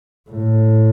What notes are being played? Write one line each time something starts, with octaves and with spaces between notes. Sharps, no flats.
A2